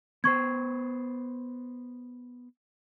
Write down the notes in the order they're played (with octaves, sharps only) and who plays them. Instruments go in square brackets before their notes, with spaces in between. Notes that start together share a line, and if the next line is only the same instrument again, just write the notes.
[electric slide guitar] B3 C5 [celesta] C#6 G#6